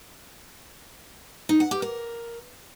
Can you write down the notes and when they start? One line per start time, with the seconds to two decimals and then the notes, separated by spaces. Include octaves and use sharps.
1.49 D#4
1.60 F#5
1.71 G4
1.82 A#4